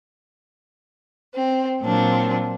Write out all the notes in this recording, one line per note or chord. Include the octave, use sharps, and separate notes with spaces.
C4
A#2 F#3 C4 D4 F4